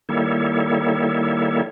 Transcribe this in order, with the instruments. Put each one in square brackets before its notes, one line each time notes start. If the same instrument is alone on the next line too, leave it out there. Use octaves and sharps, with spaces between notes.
[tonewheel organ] D#3 G3 A#3 E4 A4 C#5